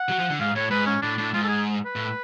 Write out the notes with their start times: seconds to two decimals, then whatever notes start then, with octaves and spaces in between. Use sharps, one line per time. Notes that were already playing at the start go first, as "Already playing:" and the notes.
Already playing: F#5
0.09 F#3
0.19 F3
0.30 D3
0.39 G#2 F5
0.56 A2 C#5
0.70 G#2 B4
0.86 C#4
1.02 A2 D4
1.18 A2 D4
1.34 G#2 F4
1.43 A4
1.48 G#4
1.85 B4
1.95 A2